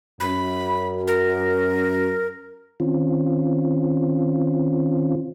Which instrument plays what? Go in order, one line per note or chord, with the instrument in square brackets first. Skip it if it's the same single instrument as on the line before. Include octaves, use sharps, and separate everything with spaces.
[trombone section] F#2 [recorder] B5
[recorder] A#4
[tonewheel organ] D#3 C4 C#4 F4